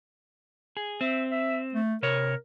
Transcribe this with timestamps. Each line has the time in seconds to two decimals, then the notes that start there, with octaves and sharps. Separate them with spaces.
0.77 G#4
1.01 C4 E5
1.31 E5
1.74 A3
2.03 C3 A#4 C#5